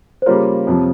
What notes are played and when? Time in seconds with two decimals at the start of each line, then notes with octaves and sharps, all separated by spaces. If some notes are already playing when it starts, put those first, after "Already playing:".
0.22 C5
0.26 C#3 G3 A#3 F4 A#4 C#5
0.67 F2 C3 F3